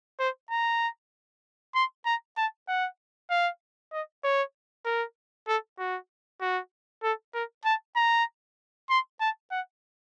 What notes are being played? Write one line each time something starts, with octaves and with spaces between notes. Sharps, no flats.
C5
A#5
C6
A#5
A5
F#5
F5
D#5
C#5
A#4
A4
F#4
F#4
A4
A#4
A5
A#5
C6
A5
F#5